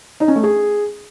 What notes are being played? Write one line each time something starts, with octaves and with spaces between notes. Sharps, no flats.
D#4
C#4
A3
G#4